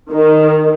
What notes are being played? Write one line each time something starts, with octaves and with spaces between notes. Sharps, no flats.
D#3